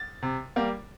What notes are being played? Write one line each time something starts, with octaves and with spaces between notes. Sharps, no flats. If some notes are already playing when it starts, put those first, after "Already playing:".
Already playing: A6
C3
G3 A#3